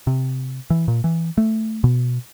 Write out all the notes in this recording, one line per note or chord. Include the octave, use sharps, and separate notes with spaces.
C3
E3
A#2
E3
A3
B2